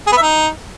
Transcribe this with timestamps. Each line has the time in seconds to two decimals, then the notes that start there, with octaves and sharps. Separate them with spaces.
0.07 G#4
0.12 B3
0.17 E5
0.22 D#4